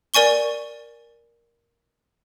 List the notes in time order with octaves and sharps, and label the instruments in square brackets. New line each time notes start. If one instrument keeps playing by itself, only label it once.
[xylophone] A#4 D5 G#5 C#6 G7